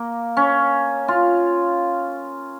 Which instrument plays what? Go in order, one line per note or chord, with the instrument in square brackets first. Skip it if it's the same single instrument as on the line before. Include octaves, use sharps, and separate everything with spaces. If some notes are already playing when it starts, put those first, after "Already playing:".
Already playing: [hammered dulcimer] A#3
C#4
F4